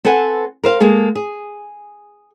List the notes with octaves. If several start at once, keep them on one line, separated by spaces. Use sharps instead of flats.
C4 A4 B4 F#5 G#5
A#4 C5 F5
G#3 A#3 G#4 A4
G#4